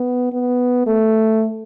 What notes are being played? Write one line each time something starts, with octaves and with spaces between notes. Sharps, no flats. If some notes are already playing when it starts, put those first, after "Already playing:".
Already playing: B3
B3
A3